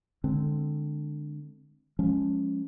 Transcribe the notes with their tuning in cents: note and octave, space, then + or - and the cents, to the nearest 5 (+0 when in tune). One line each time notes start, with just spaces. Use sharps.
D3 +15 G#3 +0 C4 +0
F3 +25 G#3 +0 C#4 +0